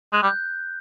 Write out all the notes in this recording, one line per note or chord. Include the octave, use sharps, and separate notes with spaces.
G#3 F#6
G3
G6